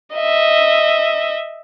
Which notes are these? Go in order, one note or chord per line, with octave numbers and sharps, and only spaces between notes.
D#5 E5